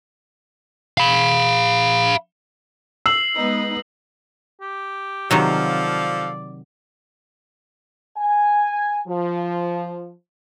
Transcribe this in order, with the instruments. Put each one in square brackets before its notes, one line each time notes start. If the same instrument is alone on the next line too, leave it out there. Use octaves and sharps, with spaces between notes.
[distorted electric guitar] F5 B5
[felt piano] E6 [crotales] C7 F#7
[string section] G#3 B3 D#4
[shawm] G4
[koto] C3 D#3 F#3 [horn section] F3 A4 F5 [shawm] D5
[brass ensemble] G#5
F3